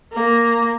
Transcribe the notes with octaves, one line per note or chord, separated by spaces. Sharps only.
A#3